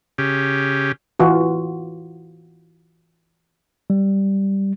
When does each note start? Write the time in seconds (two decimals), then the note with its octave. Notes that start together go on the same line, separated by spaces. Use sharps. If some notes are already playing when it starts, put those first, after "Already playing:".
0.18 C#3 G4
1.19 E3 F4 F#4
3.90 G3